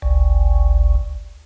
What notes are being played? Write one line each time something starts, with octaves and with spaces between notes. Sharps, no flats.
G1 C#2